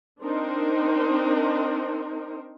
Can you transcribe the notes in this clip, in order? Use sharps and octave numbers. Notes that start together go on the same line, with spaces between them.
C4 D4 D#4 A#4 C5